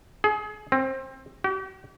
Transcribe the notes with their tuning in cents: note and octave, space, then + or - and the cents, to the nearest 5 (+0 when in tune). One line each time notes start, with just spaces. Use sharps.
G#4 +30
C4 +20
G4 -45